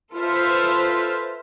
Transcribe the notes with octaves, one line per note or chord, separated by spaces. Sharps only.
F4 A4 B4 C5 E5